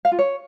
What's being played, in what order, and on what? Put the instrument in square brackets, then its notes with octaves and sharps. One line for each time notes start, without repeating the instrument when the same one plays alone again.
[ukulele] F5
F4
C#5